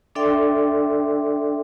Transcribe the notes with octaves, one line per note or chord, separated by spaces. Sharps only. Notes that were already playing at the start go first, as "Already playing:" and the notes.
D4 A4 D5 E5 G5 C6